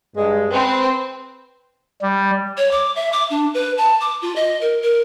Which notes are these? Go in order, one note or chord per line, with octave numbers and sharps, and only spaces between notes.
G2 G#3
C4 B4
G3
C#5
D6
E5
D6
D4
B4
A5
D6
F4
D#5
A#4
A#4